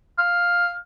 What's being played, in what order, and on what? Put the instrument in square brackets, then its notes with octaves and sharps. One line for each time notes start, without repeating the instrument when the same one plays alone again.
[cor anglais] F5